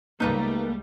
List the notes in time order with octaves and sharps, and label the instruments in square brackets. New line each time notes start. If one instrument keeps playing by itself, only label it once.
[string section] C#2 G3 A3 [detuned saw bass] A#3 [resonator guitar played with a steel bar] D#4 B4 A#5